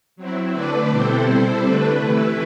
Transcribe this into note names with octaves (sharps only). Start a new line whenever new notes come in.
F#3 C4 E4
D3 A3 D4 B4 D5
B2 G3 C4 E4 A4 C5
C3 G3 C4 E4
D3 A3 D4 B4
C3 E3 A3 E4